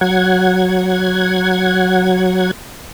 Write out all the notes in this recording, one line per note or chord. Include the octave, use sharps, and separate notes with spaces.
F#3 F#5 G#6